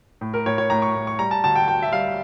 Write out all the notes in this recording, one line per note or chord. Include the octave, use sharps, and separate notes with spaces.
A2
A#4
A2 C#5
C#5
A2 A#5
C#6
A2
C#6
G3 A#5
A5
D2 A5
G5
D2 G5
E5
G3 F5